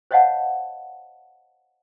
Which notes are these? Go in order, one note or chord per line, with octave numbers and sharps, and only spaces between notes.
C5 C#5 D#5 F5 F#5 A5